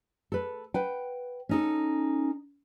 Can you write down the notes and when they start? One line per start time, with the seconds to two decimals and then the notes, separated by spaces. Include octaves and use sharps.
0.32 A4 B4
0.74 B4 F#5 G5
1.49 C#4 D#4 A4